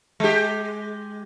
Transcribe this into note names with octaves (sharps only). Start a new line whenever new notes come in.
G#3 G4